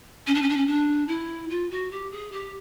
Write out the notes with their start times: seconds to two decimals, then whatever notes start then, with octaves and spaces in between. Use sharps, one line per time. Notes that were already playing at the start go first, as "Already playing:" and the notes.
0.27 C#4
0.34 D4
0.42 C#4
0.49 D4
0.57 C#4
0.67 D4
1.08 E4
1.50 F4
1.70 F#4
1.91 G4
2.11 G#4
2.32 G4